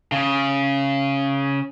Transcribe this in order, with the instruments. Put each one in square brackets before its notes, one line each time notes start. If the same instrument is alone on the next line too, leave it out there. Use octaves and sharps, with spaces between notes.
[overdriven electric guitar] C#3